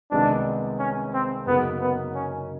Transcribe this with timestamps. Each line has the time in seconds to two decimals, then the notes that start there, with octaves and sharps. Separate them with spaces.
0.11 C2 C3 D#3 G#3 B3 D4
0.79 C#4
1.13 C4
1.46 F#2 C#3 F#3 A#3 B3 D#4
1.81 B3
2.15 C#4